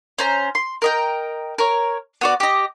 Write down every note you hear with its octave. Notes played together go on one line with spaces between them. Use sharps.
C#4 C5 A#5
C6
A#4 D#5 G5
A#4 C#5
B3 F#4 D5
G4 D#5